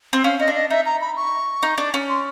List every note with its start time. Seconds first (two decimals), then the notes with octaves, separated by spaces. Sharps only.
0.13 C4
0.24 C#4 F5
0.40 C#4 D#5
0.48 D4
0.55 D#5
0.70 D#4 E5
0.86 A#5
1.01 B5
1.17 C#6
1.63 D#4
1.78 D4
1.94 C#4
2.09 C6